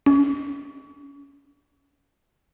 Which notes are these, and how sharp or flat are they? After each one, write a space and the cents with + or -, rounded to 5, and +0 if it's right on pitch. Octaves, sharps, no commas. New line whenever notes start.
C#4 +35